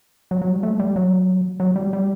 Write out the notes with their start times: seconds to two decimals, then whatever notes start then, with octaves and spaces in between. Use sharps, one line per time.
0.31 F#3
0.41 F#3
0.51 G3
0.63 A3
0.80 G3
0.96 F#3
1.60 F#3
1.76 G3
1.93 G3